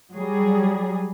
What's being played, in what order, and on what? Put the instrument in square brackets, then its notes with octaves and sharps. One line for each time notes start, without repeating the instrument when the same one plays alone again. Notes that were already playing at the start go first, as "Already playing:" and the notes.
[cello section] F#3 G3 G#4